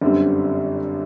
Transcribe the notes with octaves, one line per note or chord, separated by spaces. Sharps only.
G1 F#2 D3 G3 C4